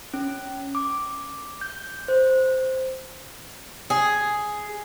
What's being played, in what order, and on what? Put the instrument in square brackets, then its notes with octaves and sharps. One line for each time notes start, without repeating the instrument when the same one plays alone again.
[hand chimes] C#4
D6
G6
C5
[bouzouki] G#4